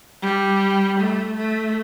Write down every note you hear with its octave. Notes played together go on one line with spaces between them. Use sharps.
G3
A3
A3